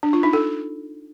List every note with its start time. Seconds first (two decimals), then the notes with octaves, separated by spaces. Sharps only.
0.03 D4
0.13 F4
0.23 D#4
0.33 A4